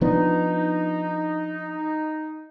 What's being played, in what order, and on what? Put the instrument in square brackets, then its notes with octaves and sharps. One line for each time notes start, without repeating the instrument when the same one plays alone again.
[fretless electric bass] F3 B3 D4 [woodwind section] D#4